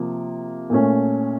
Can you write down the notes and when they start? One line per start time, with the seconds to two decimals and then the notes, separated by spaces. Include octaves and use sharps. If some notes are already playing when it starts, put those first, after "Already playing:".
Already playing: C3 F3 A#3
0.70 A#2 A3 C#4